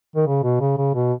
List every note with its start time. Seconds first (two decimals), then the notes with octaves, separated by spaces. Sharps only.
0.16 D#3
0.27 C#3
0.44 B2
0.61 C#3
0.78 C#3
0.95 B2